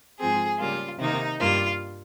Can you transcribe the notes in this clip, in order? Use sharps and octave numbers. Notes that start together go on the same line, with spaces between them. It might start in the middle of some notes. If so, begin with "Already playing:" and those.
G#2 F3 C4 G#4
C#3 G3 A#3 F4
C3 D#3 A#3 D#4
G2 G3 A#3 F4